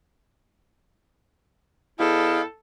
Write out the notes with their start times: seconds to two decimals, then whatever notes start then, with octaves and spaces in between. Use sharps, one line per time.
1.99 E2 E4 A4 D#5 F5 G5